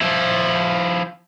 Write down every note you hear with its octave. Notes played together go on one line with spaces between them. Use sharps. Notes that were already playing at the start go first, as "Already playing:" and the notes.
F3 E4